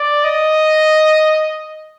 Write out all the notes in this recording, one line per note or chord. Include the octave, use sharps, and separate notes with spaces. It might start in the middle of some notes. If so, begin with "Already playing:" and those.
Already playing: D5
D#5